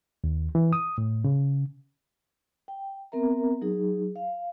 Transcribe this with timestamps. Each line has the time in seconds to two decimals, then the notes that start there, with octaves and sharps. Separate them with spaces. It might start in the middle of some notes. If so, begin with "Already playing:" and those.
0.24 D#2
0.55 E3
0.73 D#6
0.98 A2
1.24 C#3
2.68 G5
3.12 B3 C4 A#4 E5 A#5
3.62 F#3 D#4 G#4
4.16 F5